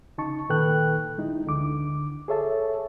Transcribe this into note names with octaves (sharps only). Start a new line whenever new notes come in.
C#3 D#4 A5 C#6
A#2 D#3 A4 B4 G5 F#6
G#3 D#4 E4
D2 D3 D6
G#4 A4 C#5 E5 A5